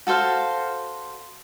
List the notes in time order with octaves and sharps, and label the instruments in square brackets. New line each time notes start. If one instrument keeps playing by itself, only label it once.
[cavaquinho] F#4 A4 C5 F5